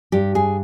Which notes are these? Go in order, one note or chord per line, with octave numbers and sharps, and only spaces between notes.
G2 G4
G#4